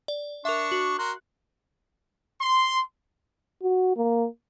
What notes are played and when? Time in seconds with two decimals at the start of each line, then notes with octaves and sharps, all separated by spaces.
0.08 D5
0.45 D4 A#4 E5 C#6
0.72 F#4
0.99 F#4 A#4 C6 F#6
2.40 C6
3.63 F#4
3.97 A#3